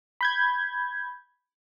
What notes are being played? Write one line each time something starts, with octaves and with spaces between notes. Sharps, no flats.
B5 G6 G#6